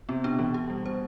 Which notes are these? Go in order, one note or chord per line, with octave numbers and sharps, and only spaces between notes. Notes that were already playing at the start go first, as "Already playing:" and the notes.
C3 B3
B2 D4
C3
B2 E3
G4
G3
B2 C5